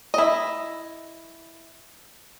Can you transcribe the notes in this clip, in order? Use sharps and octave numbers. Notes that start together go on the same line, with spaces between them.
E4 D#5